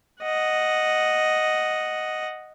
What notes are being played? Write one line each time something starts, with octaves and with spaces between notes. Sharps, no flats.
D#5 F#5